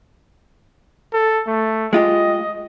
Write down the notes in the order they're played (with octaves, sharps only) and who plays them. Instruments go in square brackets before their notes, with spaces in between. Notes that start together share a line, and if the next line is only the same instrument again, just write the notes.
[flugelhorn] A4
A3
[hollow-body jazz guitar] G#3 F4 G4 [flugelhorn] D#5